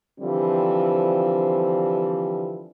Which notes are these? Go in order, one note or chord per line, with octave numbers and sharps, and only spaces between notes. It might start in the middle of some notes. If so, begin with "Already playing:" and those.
D3 E3 F3 G3 C4